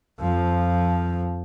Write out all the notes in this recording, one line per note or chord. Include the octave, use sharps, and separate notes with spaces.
F2 F3